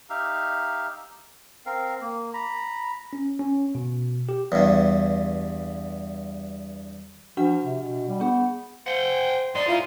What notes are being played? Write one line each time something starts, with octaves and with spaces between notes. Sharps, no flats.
D#4 G4 E5 F5
C4 A#4 F5
A#3
A#5 B5
C#4
C#4
B2
G4
E2 G2
F3 D4 F#4 F#5
C3
B2
G3
B3 D4 G#4
C5 F#5 G5
G#2 D#4 D5 C6
E4 F4